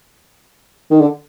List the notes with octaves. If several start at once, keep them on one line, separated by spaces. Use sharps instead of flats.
D#3
D3